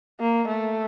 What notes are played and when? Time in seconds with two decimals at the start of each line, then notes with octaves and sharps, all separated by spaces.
0.20 A#3
0.48 A3